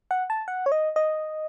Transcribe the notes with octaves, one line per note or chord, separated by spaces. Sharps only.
F#5
A5
F#5
C#5
D#5
D#5